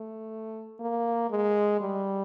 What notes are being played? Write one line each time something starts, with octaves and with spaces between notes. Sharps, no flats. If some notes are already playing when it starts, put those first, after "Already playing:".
Already playing: A3
A#3
G#3
G3